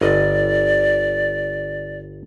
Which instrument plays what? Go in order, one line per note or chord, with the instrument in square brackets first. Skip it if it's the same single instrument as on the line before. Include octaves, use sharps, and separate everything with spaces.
[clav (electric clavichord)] G1 D#5 [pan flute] D5